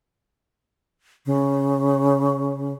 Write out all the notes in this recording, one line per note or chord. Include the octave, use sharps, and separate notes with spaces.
C#3